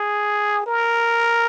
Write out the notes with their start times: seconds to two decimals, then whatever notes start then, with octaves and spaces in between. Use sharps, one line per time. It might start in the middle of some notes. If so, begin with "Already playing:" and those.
Already playing: G#4
0.67 A#4